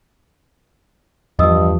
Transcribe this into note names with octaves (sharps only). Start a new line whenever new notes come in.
E2 G2 F3 D#5 D#6 E6